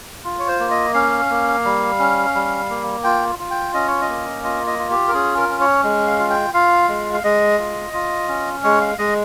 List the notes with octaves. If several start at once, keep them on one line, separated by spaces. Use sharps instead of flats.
F4
C#5
C5
A#3
D#5
C#4 F5
A#3
G3
C#4
G3
A#3
F4 G5
F4
G5
C#4 D#5
C#5
D#5
A#3
F4 D#5
D#5
F4
G4
A#4
C#4 G#4
A#4
C#4
C#5
G#3
F5
F4
G5
F4 F5
G#3
F5
G#3 D#5
F4
F4
C#4
G#3 C#5
F5
G#3 D#5